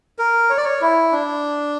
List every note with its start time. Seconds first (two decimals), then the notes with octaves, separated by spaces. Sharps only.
0.19 A#4
0.50 C#5
0.57 D5
0.64 C#5
0.81 E4
1.12 D4